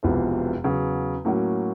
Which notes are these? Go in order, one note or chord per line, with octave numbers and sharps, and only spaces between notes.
E1 E2 C3 F3
E2 C#3 F#3
A2 F#3 A#3 C#4 F#4